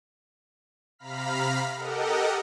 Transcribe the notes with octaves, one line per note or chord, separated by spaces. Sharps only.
C3 F5 A#5 B5 F6 B6
G4 A4 A#4 D#5 F#5